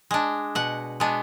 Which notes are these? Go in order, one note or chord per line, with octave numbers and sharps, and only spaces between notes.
G#3 D4
B2 F#5
G#3 B3 D4